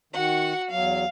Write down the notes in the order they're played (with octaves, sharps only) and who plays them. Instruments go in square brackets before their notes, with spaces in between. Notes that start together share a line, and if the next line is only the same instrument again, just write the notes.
[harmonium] D#3 [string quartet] F#4 F#5
[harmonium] E2 F#3 [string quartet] F5